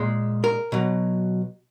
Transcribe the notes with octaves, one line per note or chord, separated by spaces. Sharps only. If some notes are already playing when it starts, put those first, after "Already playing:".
Already playing: A#2 G#3
A#4
B2 F#3